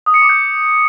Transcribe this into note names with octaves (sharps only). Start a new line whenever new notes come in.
D#6
C#7
D6
G6